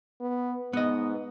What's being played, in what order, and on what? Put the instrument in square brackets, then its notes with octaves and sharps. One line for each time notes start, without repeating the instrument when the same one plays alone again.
[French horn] B3
[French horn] G#2 [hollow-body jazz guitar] B3 D#5